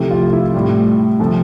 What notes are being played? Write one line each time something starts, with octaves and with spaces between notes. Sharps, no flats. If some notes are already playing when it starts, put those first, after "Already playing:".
Already playing: C3 F3 A3 E4 G4
F4
E4
A2 G3
C3 F3 A3